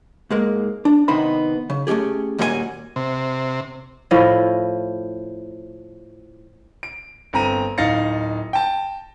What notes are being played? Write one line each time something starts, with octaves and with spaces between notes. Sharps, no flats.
G#2 G#3 A#3
D4
C3 D#3 B3 D#4 C5 B5
C#3
A3 C#4 D4 G4 G#4
D#2 A#2 G3 F#4 G4 G#5
C3
A2 F3 E4 D#5
D7
G1 C4 A#5 D#7
D1 D#4 F5 A6 A#6 C#7
G5 A5